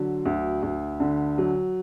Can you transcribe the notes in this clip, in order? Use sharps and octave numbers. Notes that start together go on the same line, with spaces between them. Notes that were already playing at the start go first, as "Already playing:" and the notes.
Already playing: D3 F#3
D2
D2
D3
F#3